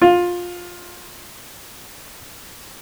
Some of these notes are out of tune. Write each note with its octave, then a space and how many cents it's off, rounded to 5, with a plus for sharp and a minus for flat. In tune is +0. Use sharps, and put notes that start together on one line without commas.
F4 +15